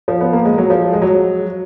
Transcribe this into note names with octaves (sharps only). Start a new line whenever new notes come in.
F3
B3
A#3
G#3
F#3
F3
G#3
F#3